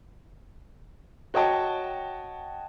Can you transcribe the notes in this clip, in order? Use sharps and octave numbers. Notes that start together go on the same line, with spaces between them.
F#4 C#5 D#5 G5 A5